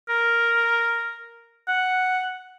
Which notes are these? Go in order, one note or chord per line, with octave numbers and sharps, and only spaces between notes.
A#4
F#5